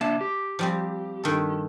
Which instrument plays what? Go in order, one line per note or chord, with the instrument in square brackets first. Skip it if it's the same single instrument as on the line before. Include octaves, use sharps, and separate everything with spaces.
[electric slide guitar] A#3 D4 E5 [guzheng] A5
[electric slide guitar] G4
[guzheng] F3 G3 C4
G2 D#3 A4